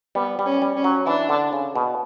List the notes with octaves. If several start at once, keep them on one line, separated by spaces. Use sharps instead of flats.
G3 B3
G3
C#4
G3
C#4
F#3
E3 D4
D3
C#3
B2